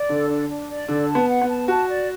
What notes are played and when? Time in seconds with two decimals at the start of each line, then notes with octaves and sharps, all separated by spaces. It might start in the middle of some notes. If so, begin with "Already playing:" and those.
Already playing: D5
0.09 D3 A4
0.29 D4
0.49 D4
0.69 D5
0.88 D3 A4
1.08 A5
1.15 B3
1.28 F#5
1.42 B3
1.48 A5
1.68 F#4 A5
1.87 D5